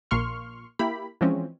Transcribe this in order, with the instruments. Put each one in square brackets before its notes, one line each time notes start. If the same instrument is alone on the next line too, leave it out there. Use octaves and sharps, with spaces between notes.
[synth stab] A#1 A#2 A#3 C6 C#6 F6
A#3 E4 G4 B5
E3 F3 G#3 C4 C#4